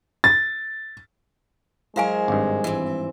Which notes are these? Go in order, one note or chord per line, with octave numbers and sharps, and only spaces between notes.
A6
F#3 G#3 E4 A#4 C5 F5 G#5
G#1 G2
E3 C4